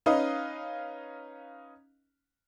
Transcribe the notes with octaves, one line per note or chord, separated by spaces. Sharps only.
C#4 D#4 B4 D#5 F5